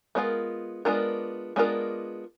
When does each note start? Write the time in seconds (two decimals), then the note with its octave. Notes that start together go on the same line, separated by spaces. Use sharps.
0.15 G#3 B3 D4 F4 A#4
0.85 G#3 B3 D4 F4 A#4
1.56 G#3 B3 D4 F4 A#4